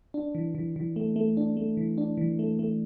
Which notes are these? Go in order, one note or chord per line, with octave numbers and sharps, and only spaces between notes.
D4
E3
E3
E3
A3
A3
D4
A3
E3
D4
E3
A3
A3